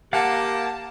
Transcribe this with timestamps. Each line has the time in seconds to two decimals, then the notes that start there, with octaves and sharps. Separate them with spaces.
0.13 A#3 G4 F5 F#5 A5